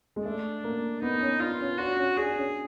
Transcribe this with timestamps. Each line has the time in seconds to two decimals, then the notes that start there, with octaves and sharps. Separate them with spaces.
0.16 G#3
0.25 A3 D4
0.64 A#3
1.02 B3 D#4
1.20 C#4
1.40 D4 F4
1.59 C#4
1.78 D4 F#4
1.97 C#4
2.17 D4 G#4
2.29 D4
2.36 C#4